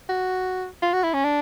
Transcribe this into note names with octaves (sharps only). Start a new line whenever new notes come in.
F#4
F4
F#4
E4
C#4
D4